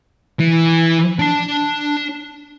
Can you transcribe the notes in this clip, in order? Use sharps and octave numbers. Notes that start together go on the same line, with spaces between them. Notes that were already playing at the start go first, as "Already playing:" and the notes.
E3
D4 A5